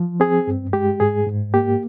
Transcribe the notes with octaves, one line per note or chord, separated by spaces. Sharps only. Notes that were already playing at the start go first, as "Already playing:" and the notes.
Already playing: F3
C4 G#4
G2
G#3 G4
G#2 G#4
G#2
A#3 G4